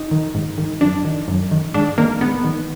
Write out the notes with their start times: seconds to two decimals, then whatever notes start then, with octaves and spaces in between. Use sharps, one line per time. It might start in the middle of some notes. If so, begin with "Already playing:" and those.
Already playing: D#4
0.11 D#3
0.35 G#2
0.58 D#3
0.81 F#2 D4
1.05 D#3
1.28 F#2
1.52 D#3
1.74 G#2 D4
1.98 D#3 A#3
2.21 G#2 B3
2.44 D#3